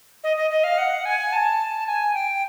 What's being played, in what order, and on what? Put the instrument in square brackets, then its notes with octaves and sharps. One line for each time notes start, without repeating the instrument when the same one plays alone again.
[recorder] D#5
D#5
D#5
F5
F#5
G#5
A5
G#5
G5